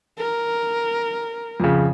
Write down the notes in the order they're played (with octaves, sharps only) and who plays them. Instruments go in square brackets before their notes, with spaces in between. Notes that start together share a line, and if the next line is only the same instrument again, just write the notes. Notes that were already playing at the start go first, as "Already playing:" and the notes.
[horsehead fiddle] A#4
[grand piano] F2 C#3